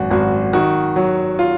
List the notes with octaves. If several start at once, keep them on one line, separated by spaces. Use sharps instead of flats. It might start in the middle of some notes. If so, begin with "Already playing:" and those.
Already playing: G#1 F#2 F#4
G#1 F#4
D#3 F#4
F#3
F4